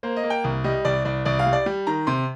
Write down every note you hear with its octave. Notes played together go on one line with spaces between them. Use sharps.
A#3 C5
D#5
A#3
G5
C2
G3 D#5
C2 D5
C2 D5
C2 D5
F5
G3
D5
G3
D#3 A#5
C3 C6